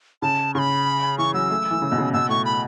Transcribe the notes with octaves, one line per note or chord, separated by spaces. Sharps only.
C#3 A5
C#3 B5 C#6
E3 C#6
F#3 E6
A3
E3
C#3
B2
C#3
B2 E6
A2 C#6
B5